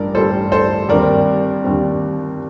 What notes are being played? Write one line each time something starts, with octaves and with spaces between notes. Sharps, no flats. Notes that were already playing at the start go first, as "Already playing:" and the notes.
Already playing: A1 G2 D3 G3 A#4 D5
A1 G2 D3 G3 A4 C5
A4 C5
D#2 D3 G3 C4 A#4 D5
D#2 D3 G3 C4